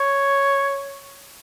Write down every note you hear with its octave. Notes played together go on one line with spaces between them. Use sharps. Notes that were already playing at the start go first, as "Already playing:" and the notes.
Already playing: C#5